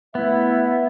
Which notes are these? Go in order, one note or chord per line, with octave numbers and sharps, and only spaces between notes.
A3 B3 E4 B4 E5